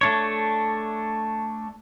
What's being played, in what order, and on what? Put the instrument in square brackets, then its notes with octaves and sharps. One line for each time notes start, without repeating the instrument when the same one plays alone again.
[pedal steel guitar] A3 D4 C#5